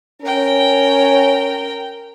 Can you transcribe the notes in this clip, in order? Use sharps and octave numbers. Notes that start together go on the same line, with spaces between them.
C#4 A#4 G5